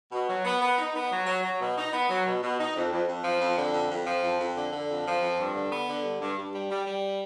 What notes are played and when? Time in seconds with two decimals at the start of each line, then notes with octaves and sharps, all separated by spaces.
0.12 B2
0.28 F#3
0.45 B3
0.61 B3
0.78 D#4
0.94 B3
1.10 F#3
1.26 F#3
1.43 F#3
1.60 B2
1.77 D#4
1.92 B3
2.09 F#3
2.25 B2
2.42 B2
2.58 D#4
2.75 F2
2.92 F2
3.07 F2
3.24 F3
3.41 F2
3.57 D3
3.73 F2
3.90 F2
4.07 F3
4.23 F2
4.39 F2
4.56 D3
4.72 D3
4.88 F2
5.06 F3
5.21 F2
5.38 G2
5.55 D3
5.71 B3
5.88 D3
6.03 G2
6.20 G2
6.37 G2
6.53 G3
6.69 G3
6.86 G3